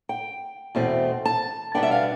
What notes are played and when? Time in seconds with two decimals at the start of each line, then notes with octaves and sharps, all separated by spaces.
0.09 G5
0.75 E2 B2 A3 C4
1.25 A5
1.75 B2 G3 B3 D4 G5
1.83 E5
1.91 F5